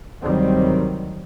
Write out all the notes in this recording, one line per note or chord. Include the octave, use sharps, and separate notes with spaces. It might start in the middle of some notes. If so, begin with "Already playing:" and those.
D2 C3 D#3 F#3 G3 C4